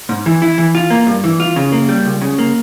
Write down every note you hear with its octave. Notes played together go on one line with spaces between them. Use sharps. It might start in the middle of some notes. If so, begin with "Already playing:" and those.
G#2
E3
E4
E3
F4
A#3
G2
E3
F4
C#3
A#3
G3
C#2
C#3
A#3